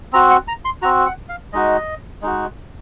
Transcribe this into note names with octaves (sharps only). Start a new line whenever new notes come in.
C4 F#4 A#5
F#5
A#5
C6
C4 F#4 A#5
F#5
F5
G#3 D#4 F#4 D#5
G#3 D#4 F#4